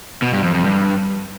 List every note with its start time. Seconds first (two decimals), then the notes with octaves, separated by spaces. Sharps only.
0.22 B2
0.33 G2
0.44 F2
0.54 F2
0.65 G2